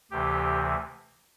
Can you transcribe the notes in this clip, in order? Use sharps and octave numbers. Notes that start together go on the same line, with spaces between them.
D2 C3 E3 G4